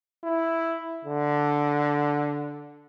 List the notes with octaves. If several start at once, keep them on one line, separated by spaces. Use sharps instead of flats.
E4
D3